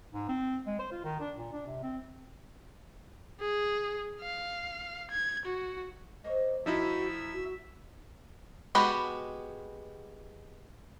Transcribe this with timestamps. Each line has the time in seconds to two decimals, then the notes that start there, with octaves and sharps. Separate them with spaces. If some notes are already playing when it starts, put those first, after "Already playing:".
0.13 G#2
0.28 C4
0.66 G#3
0.79 C5
0.91 F4
1.04 D#3
1.20 D4
1.37 A#2
1.53 D4
1.67 C3
1.83 C4
3.41 G#4
4.22 F5
5.11 G#6
5.45 F#4
6.24 A#3 C5 C#5 D#5
6.66 D2 A#2 F3 D#4 E4 F#4 E5 E6
7.33 F#4
8.75 G#3 B3 F#4 G4 B5